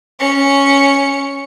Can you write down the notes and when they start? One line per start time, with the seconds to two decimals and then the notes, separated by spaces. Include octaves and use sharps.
0.20 C#4 C#7